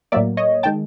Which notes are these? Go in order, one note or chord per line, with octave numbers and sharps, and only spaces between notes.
A2 F#3 A#3 D5 E5
C#5 D#5
D#3 G#3 G5 A5